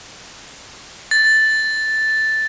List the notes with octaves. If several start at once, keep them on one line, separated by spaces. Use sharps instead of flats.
A6